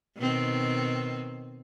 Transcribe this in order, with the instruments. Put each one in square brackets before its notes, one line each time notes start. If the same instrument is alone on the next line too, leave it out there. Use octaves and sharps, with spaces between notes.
[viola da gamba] B2 D#3 C4